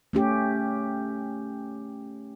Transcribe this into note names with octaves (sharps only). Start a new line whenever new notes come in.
A3 C#4 G4